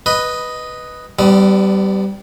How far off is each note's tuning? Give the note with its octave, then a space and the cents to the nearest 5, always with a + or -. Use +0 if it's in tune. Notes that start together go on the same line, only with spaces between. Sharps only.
B4 +0 D#5 +0
G3 -15 B3 +40 D4 +20